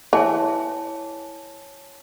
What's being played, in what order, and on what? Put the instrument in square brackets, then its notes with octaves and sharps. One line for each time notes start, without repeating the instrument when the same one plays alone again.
[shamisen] E3 [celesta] C#5 G#5 A5